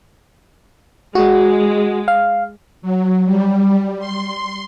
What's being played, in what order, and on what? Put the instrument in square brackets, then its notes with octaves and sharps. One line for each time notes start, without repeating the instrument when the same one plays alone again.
[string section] G#3 [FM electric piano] F#4
[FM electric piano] F5
[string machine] F#3
G3
C6